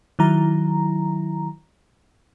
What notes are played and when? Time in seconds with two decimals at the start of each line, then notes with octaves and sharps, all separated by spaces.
0.19 D#3 F#3 E4 A#5